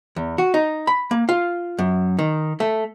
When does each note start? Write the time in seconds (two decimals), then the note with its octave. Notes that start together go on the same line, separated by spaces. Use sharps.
0.16 E2
0.38 F#4
0.54 D#4
0.87 B5
1.11 A#3
1.29 F4
1.79 F#2
2.19 D#3
2.60 A3